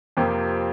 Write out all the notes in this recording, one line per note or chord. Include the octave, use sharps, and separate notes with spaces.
F2 C3 F3 A#3 G4